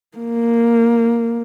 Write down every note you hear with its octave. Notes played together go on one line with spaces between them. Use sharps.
A#3